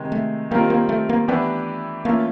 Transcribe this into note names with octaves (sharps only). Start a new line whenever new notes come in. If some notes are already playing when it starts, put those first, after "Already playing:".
Already playing: C3 D#3 G#3
A3
D#3 G3 A#3 C4 F4 A#4
A#3
A3
A#3
E3 A3 B3 D4 G4 B4
E3 A3 A#3 C#4 F4